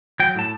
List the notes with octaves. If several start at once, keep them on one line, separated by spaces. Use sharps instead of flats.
F#3 G5
A2 A5